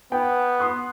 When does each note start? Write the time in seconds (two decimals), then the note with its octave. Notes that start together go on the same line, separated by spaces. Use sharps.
0.12 B3 G5
0.59 C6 D#6 F#6